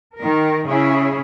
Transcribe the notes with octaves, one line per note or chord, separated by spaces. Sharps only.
D#3 A#4
C#3 C#4 E4 G#4